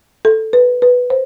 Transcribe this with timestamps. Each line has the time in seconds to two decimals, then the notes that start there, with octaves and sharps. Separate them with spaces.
0.25 A4
0.53 B4
0.82 B4
1.10 C5